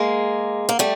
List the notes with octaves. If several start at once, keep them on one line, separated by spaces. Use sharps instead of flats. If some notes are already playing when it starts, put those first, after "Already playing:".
Already playing: G#3 A#3
A#3
G3 A3